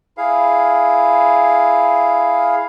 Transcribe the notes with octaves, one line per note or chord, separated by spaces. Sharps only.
E4 G#4 F5